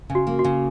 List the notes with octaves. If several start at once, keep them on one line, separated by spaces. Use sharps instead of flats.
C#3
F#4
A#3
F#4
C#3